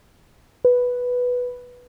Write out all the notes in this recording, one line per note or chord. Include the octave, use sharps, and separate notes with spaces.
B4